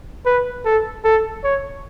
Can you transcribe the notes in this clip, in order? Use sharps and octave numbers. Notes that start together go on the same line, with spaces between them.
B4
A4
A4
C#5